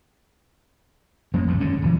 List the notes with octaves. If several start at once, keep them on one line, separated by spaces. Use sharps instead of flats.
F#2 F3 A#3 C#4
E1 C2 A2
G#1 G#2 D3 C#4
D#1 D2 E3 F#3